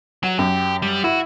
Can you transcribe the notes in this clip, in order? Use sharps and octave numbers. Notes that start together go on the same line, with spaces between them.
F#3 F#5
F#2 G4
G3
E4 F#4